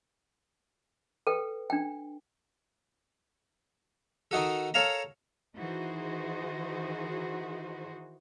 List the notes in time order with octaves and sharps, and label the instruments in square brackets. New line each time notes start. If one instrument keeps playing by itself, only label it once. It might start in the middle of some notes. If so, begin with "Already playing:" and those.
[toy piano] A4 B4 G5
D4 G5
[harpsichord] D#3 D#4 F#4 A4
A4 A#4 C#5 F5 A5 A#5
[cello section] D#3 E3 D#4 F#4 G#4 C5